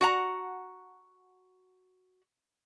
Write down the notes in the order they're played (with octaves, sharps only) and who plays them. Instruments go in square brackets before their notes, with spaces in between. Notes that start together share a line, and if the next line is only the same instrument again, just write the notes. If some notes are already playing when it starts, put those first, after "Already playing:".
[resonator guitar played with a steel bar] F#4 F#5 A#5